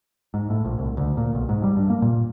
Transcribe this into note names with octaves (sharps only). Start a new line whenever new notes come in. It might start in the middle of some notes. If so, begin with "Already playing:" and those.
G#2
A2
A#1
C2
D2
A#2
B1
G#2
G3
G2
A#3
A#2